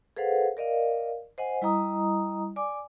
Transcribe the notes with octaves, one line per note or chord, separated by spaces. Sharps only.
G#4 A4 B4 C5 F5 F#5
A#4 D5 D#5 F5
C5 D#5 F#5 G#5
G3 E4 D#5 A#5 D#6
D5 G#5 D6